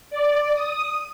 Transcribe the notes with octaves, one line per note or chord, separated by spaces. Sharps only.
D5
D#6